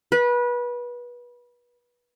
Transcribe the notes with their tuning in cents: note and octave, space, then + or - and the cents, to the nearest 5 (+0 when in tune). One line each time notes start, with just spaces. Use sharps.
B4 -25